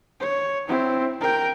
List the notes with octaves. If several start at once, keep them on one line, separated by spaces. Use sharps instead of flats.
C#5
C4 E4
A#4 G5